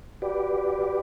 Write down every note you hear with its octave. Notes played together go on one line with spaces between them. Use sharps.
F#4 G4 B4 D5